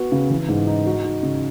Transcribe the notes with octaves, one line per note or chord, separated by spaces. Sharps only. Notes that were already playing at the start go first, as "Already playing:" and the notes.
Already playing: B3 F#4
C#3
E3
G#2
D#4
F#4
D#4
C#3